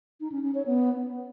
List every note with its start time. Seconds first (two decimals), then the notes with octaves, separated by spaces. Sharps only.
0.20 D#4
0.32 C#4
0.43 C#4
0.55 C#5
0.66 B3